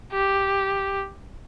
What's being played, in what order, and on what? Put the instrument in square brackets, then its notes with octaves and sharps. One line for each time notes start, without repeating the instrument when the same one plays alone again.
[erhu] G4